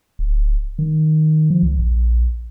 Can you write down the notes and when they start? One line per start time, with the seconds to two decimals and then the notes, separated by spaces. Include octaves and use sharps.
0.19 D1
0.79 D#3
1.50 F3
1.63 C#2
1.79 A#1